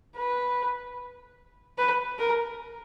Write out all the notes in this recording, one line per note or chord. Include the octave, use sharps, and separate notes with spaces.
B4
B4
A#4